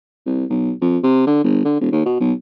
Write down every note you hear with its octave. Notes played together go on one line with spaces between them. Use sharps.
C2
B1
F2
C3
D3
G1
D3
E1
D#2
B2
B1